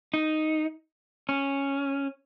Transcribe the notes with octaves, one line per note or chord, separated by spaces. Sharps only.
D#4
C#4